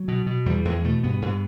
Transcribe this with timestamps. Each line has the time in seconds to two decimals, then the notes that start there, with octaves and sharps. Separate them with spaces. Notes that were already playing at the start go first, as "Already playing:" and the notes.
Already playing: F#3
0.08 B2
0.26 B2
0.46 E2 G3
0.65 E2 G#3
0.84 B2 A3
1.03 G2 B3
1.22 G2